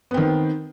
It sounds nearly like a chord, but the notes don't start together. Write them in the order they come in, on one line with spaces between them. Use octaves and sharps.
B3 C4 D#3